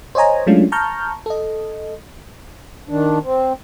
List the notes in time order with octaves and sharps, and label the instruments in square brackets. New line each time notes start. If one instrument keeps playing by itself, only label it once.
[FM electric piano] C5 C#5 D#5 G#5 A#5
F#3 G#3 A3 C#4 D4 F4
A5 A#5 C#6 F6 G6
A4 D#5
[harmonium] D#3 D4
C4